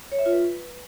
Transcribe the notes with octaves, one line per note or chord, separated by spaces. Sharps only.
C#5
E5
F4
B4